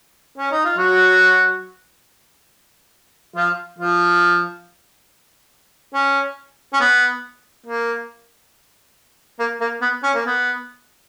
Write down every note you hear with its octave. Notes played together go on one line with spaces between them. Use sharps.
C#4
D#4
F4
F#3 F#4
F3 F4
F3 F4
C#4
C#4
B3
A#3
A#3
A#3
B3
C#4
A#3
B3